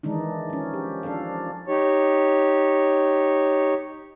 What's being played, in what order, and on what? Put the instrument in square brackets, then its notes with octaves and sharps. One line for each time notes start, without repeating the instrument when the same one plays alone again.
[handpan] D#3 E3 G#3 D4 D#4
F3 C#4
G4
F3 C#4 D4 A4 F5
[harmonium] D#4 G4 C#5